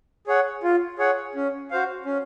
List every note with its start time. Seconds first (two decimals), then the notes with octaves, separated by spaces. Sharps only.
0.27 G#4 C#5 F#5
0.63 F4
0.98 G#4 C#5 F#5
1.35 C#4
1.71 F#4 C5 F5
2.05 C#4